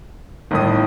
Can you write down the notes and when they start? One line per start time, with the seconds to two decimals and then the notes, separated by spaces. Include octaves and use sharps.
0.51 G1 A2 D#3 D#6